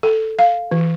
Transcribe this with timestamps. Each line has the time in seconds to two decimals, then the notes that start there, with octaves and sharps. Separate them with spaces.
0.03 A4
0.39 F5
0.71 E3